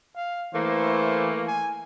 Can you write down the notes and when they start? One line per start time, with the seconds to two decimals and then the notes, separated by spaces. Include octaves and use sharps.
0.16 F5
0.54 E3 A3 A#3 C5
1.47 G#5